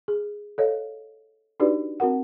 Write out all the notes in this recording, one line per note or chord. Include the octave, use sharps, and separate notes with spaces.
G#4
A4 C#5 D#5 F5
D4 D#4 F#4 G4 B4 D5
C4 F#4 A#4 F#5